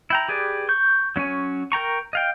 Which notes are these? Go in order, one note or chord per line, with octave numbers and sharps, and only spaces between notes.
E4 G5 A#5
G4 G#4 B4 D5
C#6 G6
F#3 C#4 C#5 G#5
A#4 G5 A#5 C#6
D#5 F5 G5